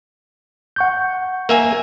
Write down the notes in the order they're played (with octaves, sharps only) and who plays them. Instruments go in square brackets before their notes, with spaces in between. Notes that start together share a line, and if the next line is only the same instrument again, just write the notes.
[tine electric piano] F#5 C#6 G6
[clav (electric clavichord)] A#3 E5 G#5